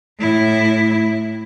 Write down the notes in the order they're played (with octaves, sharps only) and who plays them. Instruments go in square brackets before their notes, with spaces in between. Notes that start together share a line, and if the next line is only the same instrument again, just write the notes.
[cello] A2 E4